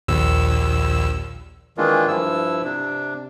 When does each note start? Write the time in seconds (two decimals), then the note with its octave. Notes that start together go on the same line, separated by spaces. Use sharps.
0.08 A#1 D#2 E6
1.77 D#3 E3 G#3 A#3 D4 F4
2.08 G2 F3 E4 E6
2.64 C3 D4